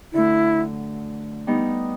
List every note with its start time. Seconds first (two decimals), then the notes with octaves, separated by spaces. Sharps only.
0.13 D3 F#3 A3 E4
1.47 G3 B3 D#4